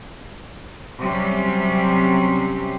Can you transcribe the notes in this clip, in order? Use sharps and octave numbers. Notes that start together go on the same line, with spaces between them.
C3 F#3 G3 C4 C#4 G4